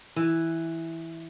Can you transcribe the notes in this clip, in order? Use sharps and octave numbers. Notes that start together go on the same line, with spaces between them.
E3